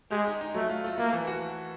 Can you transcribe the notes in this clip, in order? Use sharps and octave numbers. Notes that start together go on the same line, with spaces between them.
G#3 G4
D#4
D#4
F#3 A3
F4
A3
A3 A#3
E3
F#4